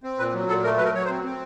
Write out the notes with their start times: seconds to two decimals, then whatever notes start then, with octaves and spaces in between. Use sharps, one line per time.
0.03 C4
0.19 A#2 B4
0.33 F#3
0.48 A#2 A4
0.64 A3 A#4
0.77 F#3 B4
0.85 A#4
0.94 F#3 C#5
1.04 C5
1.09 C4
1.24 C4